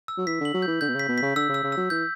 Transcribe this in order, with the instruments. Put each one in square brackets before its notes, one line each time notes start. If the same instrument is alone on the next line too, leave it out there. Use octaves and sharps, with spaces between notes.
[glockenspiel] E6
[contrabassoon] F#3
[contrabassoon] E3 [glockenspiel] B6
[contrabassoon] D3
[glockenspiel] F#7
[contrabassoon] F#3
[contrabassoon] E3 [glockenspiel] G6
[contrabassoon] D3 [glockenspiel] G6
[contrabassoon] B2
C#3
[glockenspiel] B6
[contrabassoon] B2
[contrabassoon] C#3 [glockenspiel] B6
[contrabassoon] D3 [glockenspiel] E6
[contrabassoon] C#3
[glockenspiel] E6
[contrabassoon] C#3
[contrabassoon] F#3 [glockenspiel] E6
[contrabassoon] E3 [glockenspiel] G6